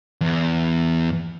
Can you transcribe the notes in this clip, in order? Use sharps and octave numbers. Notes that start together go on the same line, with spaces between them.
E2